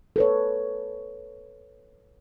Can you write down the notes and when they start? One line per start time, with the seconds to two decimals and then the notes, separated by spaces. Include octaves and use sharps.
0.16 A4 B4 C#5